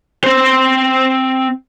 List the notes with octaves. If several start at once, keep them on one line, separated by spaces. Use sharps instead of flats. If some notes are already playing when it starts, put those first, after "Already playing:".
C4 C5